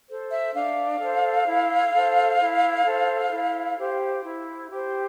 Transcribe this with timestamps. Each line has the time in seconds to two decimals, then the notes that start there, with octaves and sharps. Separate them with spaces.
0.08 A4 C5
0.31 E5
0.54 D4 F5
1.00 A4 C5
1.47 E4
1.93 A4 C5
2.40 E4
2.86 A4 C5
3.32 E4
3.78 G4 C5
4.25 E4
4.70 G4 C5